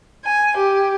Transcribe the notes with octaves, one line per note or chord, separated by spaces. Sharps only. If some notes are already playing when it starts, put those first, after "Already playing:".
G#5
G4